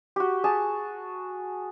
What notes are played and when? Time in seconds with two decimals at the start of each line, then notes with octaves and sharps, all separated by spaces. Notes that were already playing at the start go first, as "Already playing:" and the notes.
0.16 F#4 G4
0.44 G#4 A5